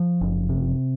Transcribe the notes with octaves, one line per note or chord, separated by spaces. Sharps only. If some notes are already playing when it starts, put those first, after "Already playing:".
Already playing: F3
F#1
C3